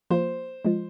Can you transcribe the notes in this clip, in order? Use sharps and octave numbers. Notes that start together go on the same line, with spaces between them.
F3 A#3 F4 C5
F3 G#3 F4